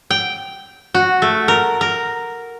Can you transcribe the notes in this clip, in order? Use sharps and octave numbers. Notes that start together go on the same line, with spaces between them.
G5
F#4
A3
A#4
A#4